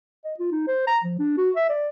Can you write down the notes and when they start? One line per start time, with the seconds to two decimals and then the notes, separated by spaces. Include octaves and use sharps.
0.25 D#5
0.39 F4
0.52 D#4
0.68 C5
0.87 A#5
1.04 F3
1.19 D4
1.38 F#4
1.56 E5
1.69 D5